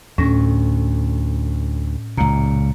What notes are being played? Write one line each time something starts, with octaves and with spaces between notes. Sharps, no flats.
D2 A2 C#4 A#6
C#2 A#2 A#5